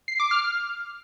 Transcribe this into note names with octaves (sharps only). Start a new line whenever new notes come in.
C7
D6
F6